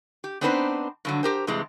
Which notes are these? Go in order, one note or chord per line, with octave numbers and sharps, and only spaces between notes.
G4
B3 C4 D4 D#4 B4 C5
G2 D3 F#3
G4 A#4 C5
G2 C3 E3 G#3